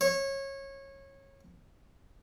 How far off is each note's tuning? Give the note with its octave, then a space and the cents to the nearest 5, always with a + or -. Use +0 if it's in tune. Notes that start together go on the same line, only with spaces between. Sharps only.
C#5 -20